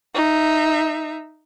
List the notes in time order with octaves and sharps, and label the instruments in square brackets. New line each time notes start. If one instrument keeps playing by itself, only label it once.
[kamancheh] D#4 E5